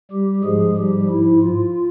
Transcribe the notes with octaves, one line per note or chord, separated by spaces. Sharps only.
G3 G4
G#2 F3 G#3 G#4
G3 G4
E4
F4